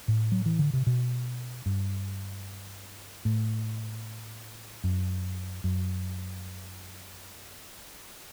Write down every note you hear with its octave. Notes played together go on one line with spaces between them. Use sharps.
A2
F#3
E3
D3
C3
B2
G2
A2
F#2
F#2